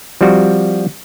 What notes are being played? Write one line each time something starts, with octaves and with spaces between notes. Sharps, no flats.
F3 G3 C4 F#4